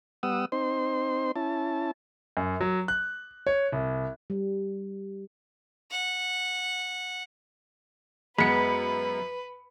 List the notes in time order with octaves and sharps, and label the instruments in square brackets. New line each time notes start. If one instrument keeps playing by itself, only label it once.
[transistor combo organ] G3 B3 F#5 D#6 E6
C4 D#4 C5 C6
C#4 E4 A5
[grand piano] F#2
F#3
F#6
C#5
C2
[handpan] G3
[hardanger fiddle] F#5
[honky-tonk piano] F#2 C#7 [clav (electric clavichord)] G#3 B3 [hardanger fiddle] B4 [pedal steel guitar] B5